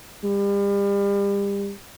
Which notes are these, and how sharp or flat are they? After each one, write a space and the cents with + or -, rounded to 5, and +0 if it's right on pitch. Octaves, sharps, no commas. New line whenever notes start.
G3 +35